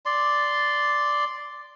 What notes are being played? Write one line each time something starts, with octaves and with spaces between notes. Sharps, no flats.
D5 C6